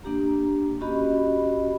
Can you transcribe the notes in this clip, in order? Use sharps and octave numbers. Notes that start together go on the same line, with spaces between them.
A#3 D4 G4 A#5
C#4 F#4 G4 D#5 B5